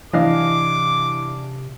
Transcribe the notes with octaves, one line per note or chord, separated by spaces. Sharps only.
C3 E3 D4 D#5 F5 D6